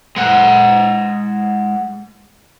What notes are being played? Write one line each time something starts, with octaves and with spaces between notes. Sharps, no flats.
G#3 F#5